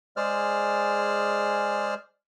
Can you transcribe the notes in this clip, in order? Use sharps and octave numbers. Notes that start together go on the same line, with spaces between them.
G#3 G#4 C5 D5 F6